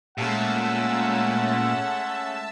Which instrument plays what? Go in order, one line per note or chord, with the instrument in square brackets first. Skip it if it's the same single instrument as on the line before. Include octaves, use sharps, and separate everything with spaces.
[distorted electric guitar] A#2 [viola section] G#3 A3 C#4 [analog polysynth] E5 A5 E6 [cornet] F#5